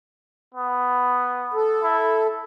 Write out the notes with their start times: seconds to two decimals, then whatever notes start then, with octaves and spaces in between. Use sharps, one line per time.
0.54 B3
1.54 A4
1.83 E4